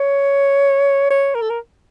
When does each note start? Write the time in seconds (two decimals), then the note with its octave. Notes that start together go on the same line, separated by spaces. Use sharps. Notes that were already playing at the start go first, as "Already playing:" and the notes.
Already playing: C#5
1.11 C#5
1.35 A#4
1.42 A4
1.50 A#4